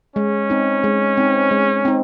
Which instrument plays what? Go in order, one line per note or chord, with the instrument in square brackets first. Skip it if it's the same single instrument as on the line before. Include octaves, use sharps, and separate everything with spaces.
[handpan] G#3 [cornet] C#4
[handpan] C4 D#4
G#3
C4 D#4
G#3
C4 D#4